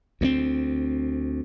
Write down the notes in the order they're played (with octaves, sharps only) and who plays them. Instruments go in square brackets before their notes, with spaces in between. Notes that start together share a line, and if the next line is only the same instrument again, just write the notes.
[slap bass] D2 G3 C4